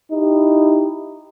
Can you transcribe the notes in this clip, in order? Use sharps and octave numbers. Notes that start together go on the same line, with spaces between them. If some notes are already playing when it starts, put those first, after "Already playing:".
D#4 E4 G4